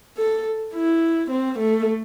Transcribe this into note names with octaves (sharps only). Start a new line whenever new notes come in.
A4
E4
C4
A3